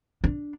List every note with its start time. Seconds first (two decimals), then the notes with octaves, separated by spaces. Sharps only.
0.24 D4